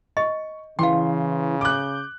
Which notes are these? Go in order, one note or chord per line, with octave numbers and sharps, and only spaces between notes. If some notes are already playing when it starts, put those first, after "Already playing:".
D#5 C#6
C#3 E3 F5 G5 C6
D6 F#6 G6